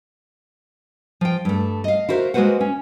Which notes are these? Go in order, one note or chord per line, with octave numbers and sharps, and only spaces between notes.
F3 G5
G2 A3
D#5 F5
E4 F#4 A#4 C5 E5 F5
G#3 A#3 F#4 B4 C5 F#5
C#4